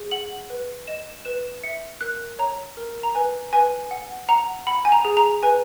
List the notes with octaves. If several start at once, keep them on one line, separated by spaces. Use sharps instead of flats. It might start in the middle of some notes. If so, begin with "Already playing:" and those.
Already playing: G#4
F#5 F#7
B4
D#5 E7
B4 E7
E5 C#7
A#4 F#6
C#5 A#5
A#4
A#5
B4 G#5
B4 G#5
F#5
F#5 A#5
F#5 B5
G#5
A#5
G#4
A#5
B4 G#5